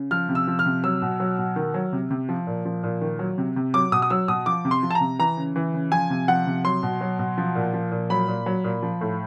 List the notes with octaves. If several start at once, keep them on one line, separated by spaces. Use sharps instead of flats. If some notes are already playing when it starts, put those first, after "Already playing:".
Already playing: C#3
F3 F6
C3
E6
F3
F6
C3
F#3 E6
B2
F#3
B2
D#3
F#3
C3
C3
F3
A#2
F3
A#2
D#3
F#3
C3
C3
F#3 D6
B2 D#6
D#6
F#3 E6
B2 D#6
F3 D6
C3
C6
F3
A5
A#5
C3
E3 A#5
C#3
E3
C#3
F3 G#5
C3
F3 F#5
C3
F#3 C6
B2
F#3
B2
F3
A#2
F3
A#2
F#3 B5
A#2
F#3
A#2
F3
A2